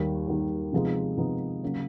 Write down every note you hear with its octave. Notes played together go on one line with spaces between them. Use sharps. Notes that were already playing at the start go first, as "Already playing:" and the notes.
Already playing: D#2 D#3 G3
D#2 D#3 G3
C3 F3 G#3 B3 D#4
C3 F3 G#3 B3 D#4
C#3 F#3 A#3